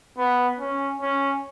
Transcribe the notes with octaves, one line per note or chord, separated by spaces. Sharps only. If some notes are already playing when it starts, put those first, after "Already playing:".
B3
C#4
C#4